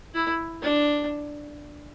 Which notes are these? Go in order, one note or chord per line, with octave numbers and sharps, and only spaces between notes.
E4
D4